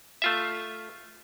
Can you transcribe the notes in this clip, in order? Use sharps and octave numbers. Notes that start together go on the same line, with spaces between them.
A3 F4 E5